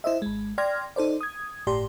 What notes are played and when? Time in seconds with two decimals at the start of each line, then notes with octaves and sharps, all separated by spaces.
0.04 E4 C5 D#5 E5
0.22 G#1 G#3
0.58 D5 G5 C6 F6 G#6 A#6
0.96 D#4 A4 C5 D5
1.21 D#6 G#6
1.67 G1 A2 G4 D5 C6